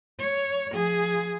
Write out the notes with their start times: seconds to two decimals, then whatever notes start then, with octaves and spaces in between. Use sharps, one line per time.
0.19 C#5
0.71 F3 G#4